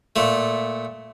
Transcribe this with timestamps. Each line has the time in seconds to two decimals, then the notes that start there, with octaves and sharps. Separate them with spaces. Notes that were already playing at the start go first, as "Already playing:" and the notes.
0.16 A#2 A3